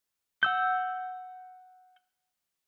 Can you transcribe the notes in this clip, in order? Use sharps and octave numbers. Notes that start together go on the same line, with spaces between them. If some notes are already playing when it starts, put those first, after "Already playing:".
F#5 E6 G6